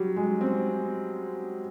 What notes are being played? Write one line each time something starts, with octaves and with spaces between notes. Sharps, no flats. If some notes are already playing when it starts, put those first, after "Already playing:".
Already playing: F#3 G3
G#3
C4